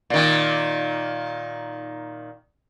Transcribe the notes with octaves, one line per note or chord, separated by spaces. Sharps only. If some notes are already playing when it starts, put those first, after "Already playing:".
A#2 D#3